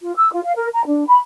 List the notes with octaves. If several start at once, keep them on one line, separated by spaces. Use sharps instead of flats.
F4
E6
F4
F5
A#4
A#5
D4
B5